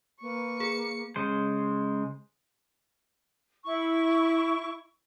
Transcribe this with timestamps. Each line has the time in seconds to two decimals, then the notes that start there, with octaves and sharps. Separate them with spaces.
0.21 A#3 B4 C#6
0.60 G#4 C#7
1.16 C#3 G#3 C5
3.65 E4 C#6